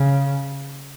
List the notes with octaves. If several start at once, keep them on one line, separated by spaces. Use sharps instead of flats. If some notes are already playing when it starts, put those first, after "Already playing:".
Already playing: C#3